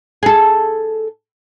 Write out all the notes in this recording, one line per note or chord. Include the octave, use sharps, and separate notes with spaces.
G#4 A4